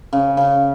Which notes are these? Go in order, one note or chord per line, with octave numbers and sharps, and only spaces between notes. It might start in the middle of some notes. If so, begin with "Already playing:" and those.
C#3
C#3